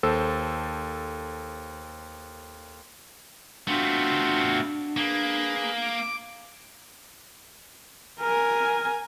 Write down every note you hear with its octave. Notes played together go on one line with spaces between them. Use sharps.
D#2 A4 C5 E6
A3 B3 C4 D4 F4 F#4
A#3 G#4 B4
D6
A#4 G#5